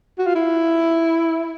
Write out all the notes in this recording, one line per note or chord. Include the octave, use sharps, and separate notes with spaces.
F#4
F4
E4